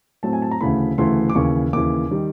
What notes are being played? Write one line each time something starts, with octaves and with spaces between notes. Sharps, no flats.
A2 F#3 A3 C4 A5
G#5
A5
A#5
D2 C#3 E3 A3 B5
D2 C#3 E3 A3 C6
D6
D#2 C#3 E3 C#6
D#2 C#3 E3 D6
D#3 G3